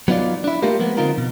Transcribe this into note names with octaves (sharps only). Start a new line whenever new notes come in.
F#3 B3 D#4 F4 D5
D4 E4
A3 A#3 F4 G4 A#4
F3 G#3 A#3 B3
D3 F3 C4 D#4 F4 A#4
B2